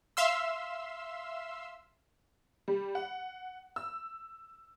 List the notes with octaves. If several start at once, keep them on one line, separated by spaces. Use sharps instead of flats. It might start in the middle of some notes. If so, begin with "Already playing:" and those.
E5 F5 C6 E6
G3
F#5
E6